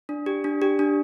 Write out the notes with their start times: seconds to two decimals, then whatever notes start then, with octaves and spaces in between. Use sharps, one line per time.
0.09 D4
0.26 G4
0.44 D4
0.62 G4
0.79 D4